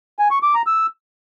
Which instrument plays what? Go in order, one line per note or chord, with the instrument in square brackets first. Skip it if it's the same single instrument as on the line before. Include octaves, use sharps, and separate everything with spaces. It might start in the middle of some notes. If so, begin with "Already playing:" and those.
[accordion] G#5
C#6
D6
A#5
E6